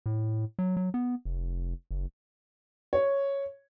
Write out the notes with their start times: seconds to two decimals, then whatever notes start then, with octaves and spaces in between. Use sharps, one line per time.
0.06 A2
0.59 F#3
0.77 F#3
0.94 B3
1.25 F1
1.91 F#1
2.93 C#5